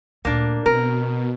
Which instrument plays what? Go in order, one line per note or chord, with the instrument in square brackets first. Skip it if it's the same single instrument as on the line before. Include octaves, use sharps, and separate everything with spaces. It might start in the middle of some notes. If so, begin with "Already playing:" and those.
[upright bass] D2 A#2 [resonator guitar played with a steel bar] A#3 D4
[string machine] B2 [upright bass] C4 [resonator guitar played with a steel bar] A#4